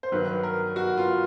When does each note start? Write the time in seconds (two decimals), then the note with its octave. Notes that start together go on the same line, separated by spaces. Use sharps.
0.03 C5
0.12 G2 D#3 F#3 B4
0.43 A#4
0.76 F#4
0.97 F4